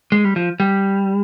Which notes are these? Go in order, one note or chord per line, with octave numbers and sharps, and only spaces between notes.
G#3
G3
F3
G3